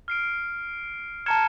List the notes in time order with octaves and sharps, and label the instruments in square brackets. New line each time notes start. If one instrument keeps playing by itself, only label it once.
[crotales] F6 C7 D7
[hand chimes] A5 A#5 G#6 [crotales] F6 C#7 E7